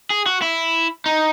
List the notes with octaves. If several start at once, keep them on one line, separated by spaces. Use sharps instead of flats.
G#4
F#4
E4
D#4